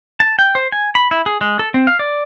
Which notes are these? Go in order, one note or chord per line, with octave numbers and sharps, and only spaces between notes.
A5
G5
C5
G#5
B5
E4
G#4
G#3
A4
C4
F5
D5